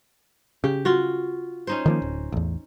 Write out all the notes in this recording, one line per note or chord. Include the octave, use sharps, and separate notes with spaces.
C#3 G4
F4 F#4
C#4 D#4 C5
D#3 F3 A#3
D1
A1 E2